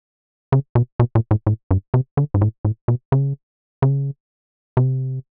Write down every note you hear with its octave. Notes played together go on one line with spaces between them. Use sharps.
C#3
B2
B2
A#2
A2
A2
G2
C3
D3
G#2
A2
A2
B2
C#3
C#3
C3